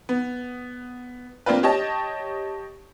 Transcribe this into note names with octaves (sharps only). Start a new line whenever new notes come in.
B3
A#3 C4 D4 F4 B4
G4 C#5 D#5 A5